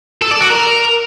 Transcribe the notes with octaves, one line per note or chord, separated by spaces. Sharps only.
A4
D5
F#4
A#4